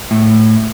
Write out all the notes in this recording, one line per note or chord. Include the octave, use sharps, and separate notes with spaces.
A2